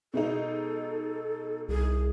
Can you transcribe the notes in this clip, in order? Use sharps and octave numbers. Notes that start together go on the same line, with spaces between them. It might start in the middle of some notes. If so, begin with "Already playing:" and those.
B2 G#3 D#4 A4
C2 G#4